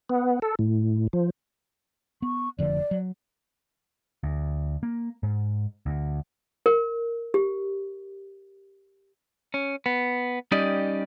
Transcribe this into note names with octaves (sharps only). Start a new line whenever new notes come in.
B3
A4
A2
F3
B3 C#6
F1 D3 F3 D5
F#3
D2
A#3
G#2
D2
A#4
G4
C#4
B3
G3 C#4 D#4 G4 D5 D#5